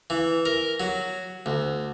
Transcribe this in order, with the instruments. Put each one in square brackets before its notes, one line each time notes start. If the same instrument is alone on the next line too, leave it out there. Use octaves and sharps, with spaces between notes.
[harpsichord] E3
A#4
F#3
D2